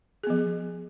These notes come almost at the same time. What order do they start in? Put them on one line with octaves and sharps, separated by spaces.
G#4 B3 F3